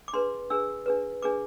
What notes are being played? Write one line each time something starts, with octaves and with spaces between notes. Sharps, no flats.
D6
D4 G#4 B4 C6
D4 G#4 B4 E6
D4 G#4 B4
D4 G#4 B4 D6